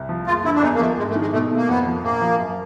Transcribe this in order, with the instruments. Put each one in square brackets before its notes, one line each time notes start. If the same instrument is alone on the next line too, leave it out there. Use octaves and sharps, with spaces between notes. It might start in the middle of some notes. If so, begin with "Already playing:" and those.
Already playing: [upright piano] C2
F3
[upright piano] F#1 [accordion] F4
[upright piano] D3 [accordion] E4
[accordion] D4
[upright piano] E2 [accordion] D#4
[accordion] A#3
[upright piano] F3 [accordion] A3
[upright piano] G#1 [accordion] G#3
[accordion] A3
[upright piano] D#3
[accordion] G#3
[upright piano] B2 [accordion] A3
[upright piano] A3
[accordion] A#3
[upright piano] F2 [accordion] B3
[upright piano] F3
[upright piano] A#1 [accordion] A#3
[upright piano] F3
F#2